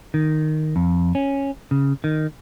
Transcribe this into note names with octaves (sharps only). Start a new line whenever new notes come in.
D#3
F2
C#4
C#3
D#3